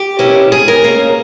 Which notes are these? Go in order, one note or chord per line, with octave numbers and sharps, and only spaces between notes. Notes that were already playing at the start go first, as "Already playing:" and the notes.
Already playing: G4
B2 A#3 C#4 E4
G#4
A#4
B2 A#3 C#4